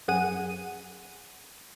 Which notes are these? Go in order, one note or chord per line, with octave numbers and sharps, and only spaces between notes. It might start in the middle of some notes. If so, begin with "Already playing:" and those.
F#2 G#4 F#5 D#7